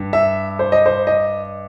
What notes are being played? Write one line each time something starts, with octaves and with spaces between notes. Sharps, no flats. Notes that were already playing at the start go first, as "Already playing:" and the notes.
Already playing: G2
E5
C5
D#5
C5
D#5